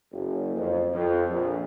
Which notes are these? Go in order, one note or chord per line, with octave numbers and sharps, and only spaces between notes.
F#1
F2
F2
A#1